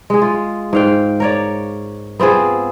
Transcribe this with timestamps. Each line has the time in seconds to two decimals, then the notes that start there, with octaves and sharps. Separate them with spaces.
0.10 G#3 G#4
0.22 F4
0.73 G#2 F5 G5
1.20 A#4 C#5 D5
2.19 B3 C4 F4 G#4